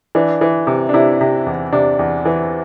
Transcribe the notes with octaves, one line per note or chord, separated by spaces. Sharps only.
E3 D4
E3
C3
D4
C3 E4
C3
E2
C3 D4
E2
E3